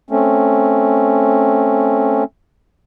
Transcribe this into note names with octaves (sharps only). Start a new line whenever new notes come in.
A3 C4 C#4